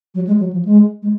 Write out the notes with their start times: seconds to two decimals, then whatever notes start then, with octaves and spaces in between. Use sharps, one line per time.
0.15 F#3
0.27 G#3
0.40 F#3
0.53 F3
0.65 G#3
1.03 G#3